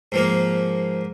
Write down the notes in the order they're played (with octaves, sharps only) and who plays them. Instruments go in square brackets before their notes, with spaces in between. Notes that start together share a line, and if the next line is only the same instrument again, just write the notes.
[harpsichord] G#2 F3 A#3